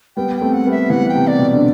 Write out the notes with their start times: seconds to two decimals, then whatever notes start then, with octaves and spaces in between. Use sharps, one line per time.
0.16 G3 B3 G5
0.36 G5
0.41 A3 C4
0.53 F#5
0.66 G3 B3
0.71 E5
0.90 E3 G3 F#5
1.09 G5
1.15 C3
1.27 D5
1.39 B2
1.54 D3